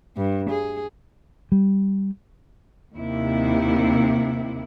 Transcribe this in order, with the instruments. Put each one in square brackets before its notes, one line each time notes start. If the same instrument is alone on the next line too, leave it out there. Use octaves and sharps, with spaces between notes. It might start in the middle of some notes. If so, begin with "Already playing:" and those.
[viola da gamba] G2
G#4
[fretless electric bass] G3
[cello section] D#2 C3 E4